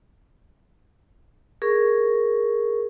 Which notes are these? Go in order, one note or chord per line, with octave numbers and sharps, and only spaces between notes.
G#4 A#4 C#6